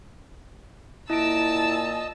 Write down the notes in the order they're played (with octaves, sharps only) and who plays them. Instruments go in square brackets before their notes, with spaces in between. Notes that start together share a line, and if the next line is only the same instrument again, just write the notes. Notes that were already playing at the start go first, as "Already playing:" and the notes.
[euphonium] A#2 [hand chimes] E4 D7 [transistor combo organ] D#5 [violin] A5 E6